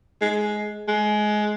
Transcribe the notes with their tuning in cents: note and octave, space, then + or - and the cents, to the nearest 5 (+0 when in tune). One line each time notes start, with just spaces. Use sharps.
G#3 +15
G#3 +20